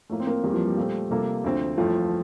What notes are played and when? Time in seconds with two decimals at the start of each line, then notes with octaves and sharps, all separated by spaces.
0.10 A2 F3 A3 A#3
0.20 C4
0.27 A#3
0.44 E2 E3 G3 A#3
0.54 F3
0.65 G3
0.77 A#2 A3 C4
1.10 C3 G3 A#3 F4 A4
1.44 D2 D3 F3 C4
1.77 G1 F2 E3 F3 A3